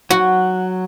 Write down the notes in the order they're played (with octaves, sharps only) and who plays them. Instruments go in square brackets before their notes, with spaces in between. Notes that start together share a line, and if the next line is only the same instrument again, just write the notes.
[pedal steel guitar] F#3 F#5 [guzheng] F#4